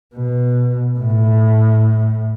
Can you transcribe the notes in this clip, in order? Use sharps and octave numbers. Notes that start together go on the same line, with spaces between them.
B2
A2